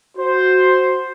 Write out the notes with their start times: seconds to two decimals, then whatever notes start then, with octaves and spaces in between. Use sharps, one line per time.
0.17 F#4 C5